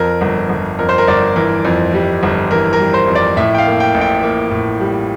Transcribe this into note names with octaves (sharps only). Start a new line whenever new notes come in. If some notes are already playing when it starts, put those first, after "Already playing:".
Already playing: F2 A#4
G1
G1
F2 A#4
C5
A#4
G1 D5
E3 A#4
F2
G3
G1
E3 A#4
A#4
G3
C5
F2
D5
A2 E5
G5
F5
A#3
G5
A1
G5
A#3
A2
G3